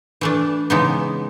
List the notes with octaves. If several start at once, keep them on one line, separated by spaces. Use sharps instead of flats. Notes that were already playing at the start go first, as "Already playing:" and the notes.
E3 A3 D4
C#3 E3 G#3 B3 D#4